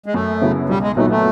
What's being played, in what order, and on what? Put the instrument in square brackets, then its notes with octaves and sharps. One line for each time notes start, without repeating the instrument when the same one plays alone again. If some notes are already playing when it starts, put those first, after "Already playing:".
[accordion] G#3
[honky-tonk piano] F#2 [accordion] A3
[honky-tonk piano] C#3 F#3 B3 E4
[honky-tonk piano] B1 [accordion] G3
[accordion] G#3
[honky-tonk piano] A#2 F#3 B3 D#4 [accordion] A3
[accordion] A3